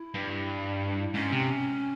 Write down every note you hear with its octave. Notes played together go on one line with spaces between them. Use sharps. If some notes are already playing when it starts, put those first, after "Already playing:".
Already playing: E4
G2
G#2 C#4
C3